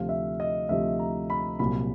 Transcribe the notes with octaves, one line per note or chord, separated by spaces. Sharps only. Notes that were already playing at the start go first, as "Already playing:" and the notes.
Already playing: D2 C3 F3 F5
E5
D#5
D2 C3 F3 E5
A#5
B5
C2 A#2 F#3 B5